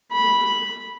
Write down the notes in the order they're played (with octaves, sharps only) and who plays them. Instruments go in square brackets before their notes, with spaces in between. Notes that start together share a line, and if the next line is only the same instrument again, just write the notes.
[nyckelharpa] B5